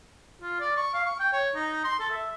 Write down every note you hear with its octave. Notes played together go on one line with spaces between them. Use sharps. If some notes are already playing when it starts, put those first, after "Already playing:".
F4
D5
C#6
F5
C#6
G5
C#5
D#4
C6
A4
E5